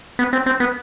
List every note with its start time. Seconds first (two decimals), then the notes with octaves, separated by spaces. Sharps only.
0.19 B3
0.33 C4
0.46 C4
0.60 B3